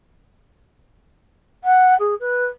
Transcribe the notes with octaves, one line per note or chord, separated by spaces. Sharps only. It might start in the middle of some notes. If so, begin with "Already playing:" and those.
F#5
G#4
B4